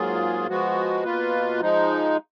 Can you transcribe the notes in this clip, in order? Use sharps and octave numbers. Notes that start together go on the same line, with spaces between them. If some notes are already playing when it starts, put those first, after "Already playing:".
Already playing: G#2 F#3 A#3 F4 G#4
F3 G#3 B3 F#4
B2 A#3 F4 B4
F3 G#3 D#4